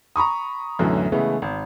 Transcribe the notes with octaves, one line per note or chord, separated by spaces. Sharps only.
A#5 B5 C#6 D#6
B1 F#2 A2 D3 E3 F#3
C#3 E3 G#3 A3 B3
G#1